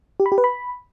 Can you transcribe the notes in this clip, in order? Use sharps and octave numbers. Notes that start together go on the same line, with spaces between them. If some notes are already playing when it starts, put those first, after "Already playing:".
G4
B5
G4
B4
B5